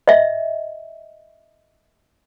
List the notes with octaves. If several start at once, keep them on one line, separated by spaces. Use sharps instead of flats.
D#5 E5